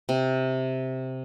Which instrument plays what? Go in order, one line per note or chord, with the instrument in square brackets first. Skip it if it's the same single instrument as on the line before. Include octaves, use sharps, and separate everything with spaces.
[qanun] C3